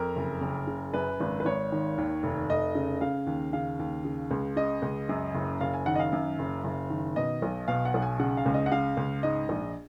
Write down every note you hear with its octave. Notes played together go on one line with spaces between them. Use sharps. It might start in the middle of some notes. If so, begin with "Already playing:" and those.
Already playing: F2 A#4
F#1
F#1
C#3
F#2 B4
G#1
B4
G#1 C#5
D#3
D#2
F1
F1 D#5
C#3
C#3 F5
D#2
C#3 F5
D#2
C#3
C#2
C#3 D#5
C#2
F#2
F#1
F#1 F5
G#5
D#3 F#5
D#5
F5
F#2
F#1
F#1
D#3
B2 D#5
B1
B2 F5
F#5
B1
G#5
C#3 F#5
F5
C#2
D#5
F#5
C#3 F5
C#2
G#2 D#5
A#1